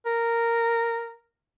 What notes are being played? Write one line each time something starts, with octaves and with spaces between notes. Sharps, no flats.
A#4